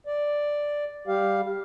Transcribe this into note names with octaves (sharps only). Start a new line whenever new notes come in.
D5
G3 G4 F5